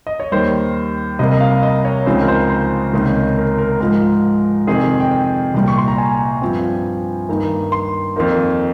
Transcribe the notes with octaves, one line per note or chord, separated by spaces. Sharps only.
D#5
C#5
D#2 D#3 G3 C5
C2 C3 G3 A#3 D#5
D#5
F5
D#5
C#5
C#2 C#3 F3 C4 D#4 C5
A#4
C5
C5
C#2 C3 D#3 A#3 C#4
A#4
A#4
G#2 F3 G#3 A#4
F2 C3 D#3 G#4
G5
G5
C2 A#2 G3
C#6
C6
A#5
G#5
G2 F3 C4
G2 D#3 A#3 D#4
C6
F2 D#3 A#3 D#4